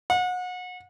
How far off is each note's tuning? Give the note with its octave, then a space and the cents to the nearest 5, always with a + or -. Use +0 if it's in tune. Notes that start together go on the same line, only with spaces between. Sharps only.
F#5 -30